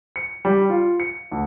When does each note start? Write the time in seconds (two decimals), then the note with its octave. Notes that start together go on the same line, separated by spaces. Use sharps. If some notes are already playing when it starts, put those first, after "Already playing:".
0.16 C#7
0.45 G3
0.69 F4
1.00 C#7
1.32 D2